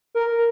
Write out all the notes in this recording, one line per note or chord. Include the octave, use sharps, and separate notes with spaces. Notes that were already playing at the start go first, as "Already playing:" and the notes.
A#4